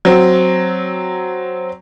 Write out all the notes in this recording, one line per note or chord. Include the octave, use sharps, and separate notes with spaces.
F#3 C4